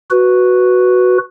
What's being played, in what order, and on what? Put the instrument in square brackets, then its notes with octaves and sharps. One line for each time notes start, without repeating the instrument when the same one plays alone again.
[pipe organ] F#4 B4